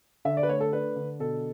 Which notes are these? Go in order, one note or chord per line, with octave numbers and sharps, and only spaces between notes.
D3 E5
D5
B4
A3 C#5
A4
D4 B4
D3
B2 A4